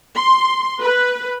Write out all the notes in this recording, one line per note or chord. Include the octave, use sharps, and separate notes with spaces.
C6
B4